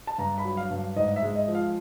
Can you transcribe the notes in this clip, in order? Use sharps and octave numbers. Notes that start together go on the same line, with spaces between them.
A5
G2 A#5
B5
F#3
F5
G2
G#2 D#5
E5
G#3
D#5
F3
F5